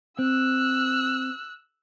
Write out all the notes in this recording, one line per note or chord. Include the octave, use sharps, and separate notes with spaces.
C4 E6 F#6